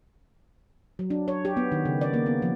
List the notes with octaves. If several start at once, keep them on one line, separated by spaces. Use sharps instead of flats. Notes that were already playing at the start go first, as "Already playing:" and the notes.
F#3
D4
C#5
G4
B3
D#3
C#3
D5
A#3
B3
F3